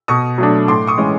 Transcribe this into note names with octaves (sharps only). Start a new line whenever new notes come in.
B2 C#6 D#6
F#3 A3 D4
A2 C6 D6
C#6 D#6
E3 G#3 C#4